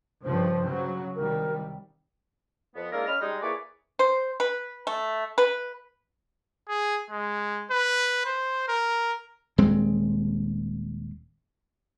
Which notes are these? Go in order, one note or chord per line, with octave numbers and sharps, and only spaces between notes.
G2 C#3 F3 C5
C#3 F#3
C2 D#3 G3 A#4
F2 B3
G#3 A#3 D4 E4 F4 A#4
C#4 D#5 B5 F6
G3 G#3 D#4
A#3 E4 G#4 B4 C#5 D5
C5
B4
A3
B4
G#4
G#3
B4
C5
A#4
D#1 G#3 C4